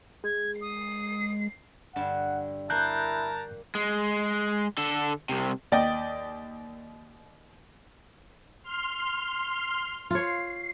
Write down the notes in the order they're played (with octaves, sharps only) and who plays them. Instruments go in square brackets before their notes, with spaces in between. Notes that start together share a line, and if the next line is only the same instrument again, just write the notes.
[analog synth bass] G#3 [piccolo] G#6
[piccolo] D#6 [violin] C7
[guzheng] G2 D3 A5 [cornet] F#5
[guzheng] A#3 [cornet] E4 [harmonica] A#4 A5 A#5 [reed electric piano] F#6 G6
[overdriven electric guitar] G#3
D3 A4
C2 C3
[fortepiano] D#2 D5 D#5 G5 D#6
[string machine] C6 F6
[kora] F4 C#5 [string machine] C7